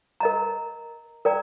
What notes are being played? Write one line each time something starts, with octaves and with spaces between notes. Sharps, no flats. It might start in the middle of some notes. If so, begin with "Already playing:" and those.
A#4 D#5 A#5
A#4 D5 G5 A#5